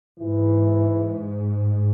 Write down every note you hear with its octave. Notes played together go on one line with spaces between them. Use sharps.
G#2 E3